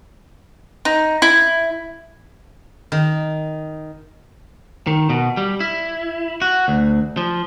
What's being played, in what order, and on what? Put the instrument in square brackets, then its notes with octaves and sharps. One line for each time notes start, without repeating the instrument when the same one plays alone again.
[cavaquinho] D#4
E4
[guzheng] D#3
[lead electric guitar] D#3
B2
G3
E4
F#4
D2
F3